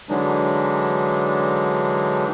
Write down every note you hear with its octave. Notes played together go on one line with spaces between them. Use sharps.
D3 E3 F#3 G#3 D4 D#4